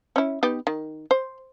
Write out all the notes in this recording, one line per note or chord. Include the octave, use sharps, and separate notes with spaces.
C#4 E4
B3 D#4 G4
D#3
C5